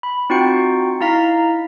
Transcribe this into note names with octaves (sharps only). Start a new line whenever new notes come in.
B5
C4 D#4 F4 F#4 G5 C#7
D#4 E4 F5 A#5 B6